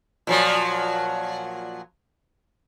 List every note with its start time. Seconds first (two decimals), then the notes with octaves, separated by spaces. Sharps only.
0.27 A#2 F3 F#3